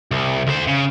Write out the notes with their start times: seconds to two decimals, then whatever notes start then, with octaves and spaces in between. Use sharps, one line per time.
0.11 C2
0.47 D2 C5
0.67 C#3